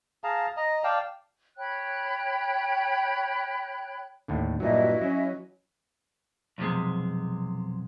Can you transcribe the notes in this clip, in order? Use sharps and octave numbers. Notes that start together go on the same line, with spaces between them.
G#4 F5 A5 A#5
D#5 A#5
D5 F5 G5 A5
C#5 G5 B5 F#6
D#2 A2 D3
G2 A#2 F#3 E4 F#4 D#5
F#3 C#4
B1 F2 A2 C3 G#3